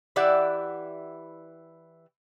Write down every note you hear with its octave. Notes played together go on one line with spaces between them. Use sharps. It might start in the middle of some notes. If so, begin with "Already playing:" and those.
E3 E4 G4 D5 E5 F#5